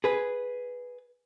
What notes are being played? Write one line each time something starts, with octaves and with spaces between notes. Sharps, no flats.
G#4 B4